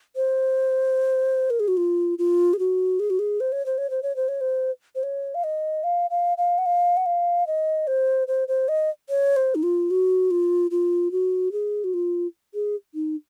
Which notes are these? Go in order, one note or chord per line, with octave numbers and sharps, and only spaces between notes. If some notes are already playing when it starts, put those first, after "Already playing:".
C5
A#4
G#4
F#4
F4
F4
G#4
F#4
G#4
F#4
G#4
C5
C#5
C5
C#5
C5
C#5
C5
C#5
C5
C5
C#5
F5
D#5
F5
F5
F5
F#5
F5
F#5
F5
D#5
C5
C5
C5
D#5
C#5
C5
D#4
F4
F#4
F4
F4
F#4
G#4
F#4
F4
G#4
D#4